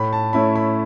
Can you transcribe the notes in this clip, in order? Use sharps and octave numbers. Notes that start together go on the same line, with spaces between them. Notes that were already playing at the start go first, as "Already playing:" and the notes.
Already playing: A2 B5
A5
A3 C#4 E4 B5
B5